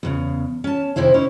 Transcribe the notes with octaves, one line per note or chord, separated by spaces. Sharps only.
E2 A2 C#3
C#4 A5
F2 C3 D#3 E4 C5
C#4 D#4 E4